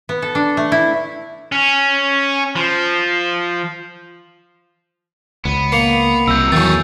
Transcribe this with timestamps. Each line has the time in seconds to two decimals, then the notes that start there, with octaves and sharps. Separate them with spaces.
0.09 B3
0.22 A4
0.35 D4
0.57 A3
0.72 E4
1.52 C#4
2.56 F3
5.45 C#2 B3
5.72 A#3 C7 C#7 F7
6.28 C2 C3 F#3 E6 G6
6.52 E2 D#3 F#3 A3 G#4 A6